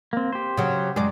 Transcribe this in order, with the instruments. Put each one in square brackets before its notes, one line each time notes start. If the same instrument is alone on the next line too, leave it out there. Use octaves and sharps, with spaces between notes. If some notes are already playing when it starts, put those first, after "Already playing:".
[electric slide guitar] A#3 C4
G4 C5
[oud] C#3 F#3
[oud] F#2 D5 [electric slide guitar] G#3 G#4